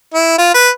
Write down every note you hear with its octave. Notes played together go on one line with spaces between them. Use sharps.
E4
F4
B4